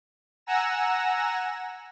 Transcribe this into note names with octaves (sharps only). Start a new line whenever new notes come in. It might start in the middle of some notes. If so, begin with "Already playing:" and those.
F#5 G#5 A#5 E6 A#6 E7